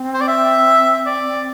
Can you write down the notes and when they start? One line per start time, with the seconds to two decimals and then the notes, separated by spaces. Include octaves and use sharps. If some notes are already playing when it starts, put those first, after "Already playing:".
Already playing: C4
0.14 C5
0.21 D5
0.28 E5
1.06 D5